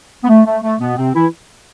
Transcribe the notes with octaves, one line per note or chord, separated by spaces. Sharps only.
B3
A3
A3
A3
B2 B3
C3 C4
E3 E4